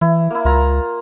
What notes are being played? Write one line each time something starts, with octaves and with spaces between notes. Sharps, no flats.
E3 E4
A#3 E4
C#2 A#3 F4 A#5